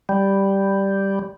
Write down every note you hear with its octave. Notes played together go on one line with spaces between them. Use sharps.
G3